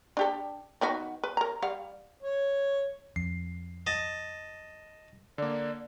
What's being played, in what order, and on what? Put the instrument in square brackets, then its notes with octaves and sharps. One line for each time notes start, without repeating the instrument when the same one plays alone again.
[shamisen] D4 G4 A4
D#3 B3 F#4
B4
A#4 A#5
G3 F5 F#5
[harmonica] C#5
[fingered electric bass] F2 [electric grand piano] C7
[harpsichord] D#5 A5
[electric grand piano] D3 A#3 [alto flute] D5